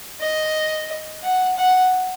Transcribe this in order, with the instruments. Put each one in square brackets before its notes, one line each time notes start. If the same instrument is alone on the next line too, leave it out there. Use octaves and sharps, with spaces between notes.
[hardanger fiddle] D#5
F#5
F#5